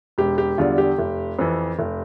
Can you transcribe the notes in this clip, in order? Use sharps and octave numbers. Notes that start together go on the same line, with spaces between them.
E1 G4
G4
E2 D3 G3 F4
G4
F1
F2 E3
F1